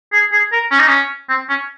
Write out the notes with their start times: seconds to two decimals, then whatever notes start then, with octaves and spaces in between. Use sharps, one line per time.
0.12 G#4
0.32 G#4
0.52 A#4
0.71 C#4
0.79 D#4
0.88 C#4
1.29 C4
1.49 C#4